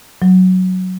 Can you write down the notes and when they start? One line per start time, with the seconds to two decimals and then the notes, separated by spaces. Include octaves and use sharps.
0.22 F#3